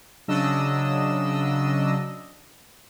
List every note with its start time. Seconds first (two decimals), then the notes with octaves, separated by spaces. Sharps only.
0.28 C#3 F#3 D4 D#5 E6